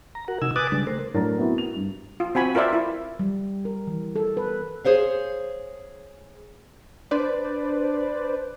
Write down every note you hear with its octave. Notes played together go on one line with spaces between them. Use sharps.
A#5
F#4 A#4 F#5
C3 D#4 G#5 E6
B4 G#5 D6 D#6 F#6 A6
C#3 G3 G#3 D4
A3 A#4 C5
A2 F#3 D4 A#4 A#5 A6
B3 C4 E4 F#4
F7
G2
F4
C4 F#4 G#5 B5
F4 A#4 C5 D5 E5
E4
G3
A#4
E3
A4
B4
G#4 C5 C#5 F5
D4 B4 C5 D5